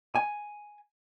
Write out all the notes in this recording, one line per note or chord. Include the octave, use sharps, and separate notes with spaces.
G#5